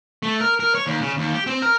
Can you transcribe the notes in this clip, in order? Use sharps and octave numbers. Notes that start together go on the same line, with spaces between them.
A3
A#4
A#4
C#5
D#2
C#3
D#2
G4
C4
A#4